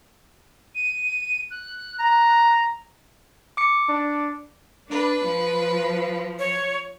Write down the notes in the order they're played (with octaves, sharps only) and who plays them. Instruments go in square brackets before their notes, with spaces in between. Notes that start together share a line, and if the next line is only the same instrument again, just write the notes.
[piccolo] D#7
F#6
[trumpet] A#5
[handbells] D6 C#7
[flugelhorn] D4
[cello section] D4 [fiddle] B4
[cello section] F3
[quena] C#5